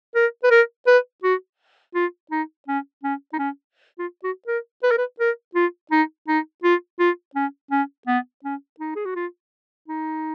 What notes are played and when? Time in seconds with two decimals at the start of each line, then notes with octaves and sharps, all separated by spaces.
0.15 A#4
0.44 B4
0.51 A#4
0.87 B4
1.23 F#4
1.95 F4
2.31 D#4
2.68 C#4
3.03 C#4
3.33 D#4
3.39 C#4
3.99 F4
4.24 F#4
4.47 A#4
4.83 B4
4.91 A#4
4.98 B4
5.20 A#4
5.55 F4
5.91 D#4
6.28 D#4
6.64 F4
6.99 F4
7.35 C#4
7.71 C#4
8.07 B3
8.44 C#4
8.80 D#4
8.96 G#4
9.05 F#4
9.15 F4
9.88 D#4